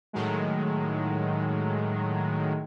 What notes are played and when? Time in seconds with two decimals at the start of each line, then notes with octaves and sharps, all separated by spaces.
0.13 A2 D#3 F#3 G#3